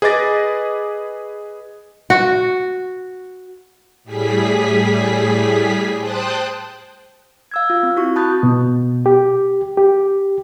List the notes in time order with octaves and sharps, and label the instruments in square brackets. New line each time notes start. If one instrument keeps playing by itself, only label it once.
[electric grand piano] G#4 B4 D#5 D6 A6 A#6
[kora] F#4
[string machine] A2 G3 G#4 B6
C5 G5 A5 D#6 F#6
[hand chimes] F5 E6 G#6
F4
C4
E4 F#4 C#6
A5 B5 D#6 F#6 G6 A6
[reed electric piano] B2
G4
G4